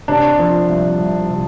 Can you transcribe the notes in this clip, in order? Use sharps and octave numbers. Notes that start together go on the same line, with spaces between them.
C3 D4
F3
C2
C2
C3